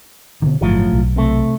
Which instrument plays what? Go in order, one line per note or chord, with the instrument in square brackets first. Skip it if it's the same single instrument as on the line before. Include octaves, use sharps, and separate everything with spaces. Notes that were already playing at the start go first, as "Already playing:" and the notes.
[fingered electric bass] B2 D3 D#3
[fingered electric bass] G1 [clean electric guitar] A2 F3 F#3
[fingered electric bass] B1
[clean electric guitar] C3 A3